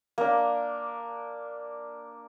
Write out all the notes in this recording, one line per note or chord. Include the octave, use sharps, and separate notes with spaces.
A#3 D4